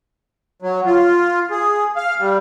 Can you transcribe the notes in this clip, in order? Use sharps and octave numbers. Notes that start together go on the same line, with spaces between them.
F#3
F4
G#4
F5
G3